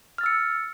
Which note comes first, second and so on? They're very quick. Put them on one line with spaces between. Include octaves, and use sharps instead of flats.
F6 A6 E6 C#7